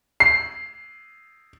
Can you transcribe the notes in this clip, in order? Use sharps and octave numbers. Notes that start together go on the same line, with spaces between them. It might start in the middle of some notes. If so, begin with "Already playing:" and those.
C7